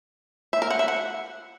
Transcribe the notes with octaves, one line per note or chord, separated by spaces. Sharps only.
E5
A#4
F#5
E5
F#5